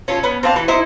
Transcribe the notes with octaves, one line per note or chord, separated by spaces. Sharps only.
C#4 F4 A4
B3 C#4
C4 D4 F5 A5
E3 A3
D#4 E4 C5